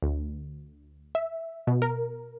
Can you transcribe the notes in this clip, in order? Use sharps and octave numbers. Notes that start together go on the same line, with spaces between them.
D2
E5
B2
A#4